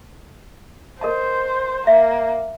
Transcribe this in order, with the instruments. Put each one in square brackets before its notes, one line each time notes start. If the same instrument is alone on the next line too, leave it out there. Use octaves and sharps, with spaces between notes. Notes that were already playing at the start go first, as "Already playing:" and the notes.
[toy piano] A#4 D#5 A5 [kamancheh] C5
[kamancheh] A#3 [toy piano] E5